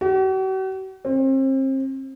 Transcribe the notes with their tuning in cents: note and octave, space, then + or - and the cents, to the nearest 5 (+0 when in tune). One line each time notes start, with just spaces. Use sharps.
F#4 +45
C4 +35